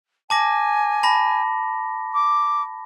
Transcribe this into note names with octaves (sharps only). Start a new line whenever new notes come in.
G#5 A5 D6 A#6
A5 B5 A#6
D6